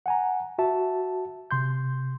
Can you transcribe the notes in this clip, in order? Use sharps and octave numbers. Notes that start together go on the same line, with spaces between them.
F#5 G#5 A#5
F#4 E5 A5
C3 C6 G6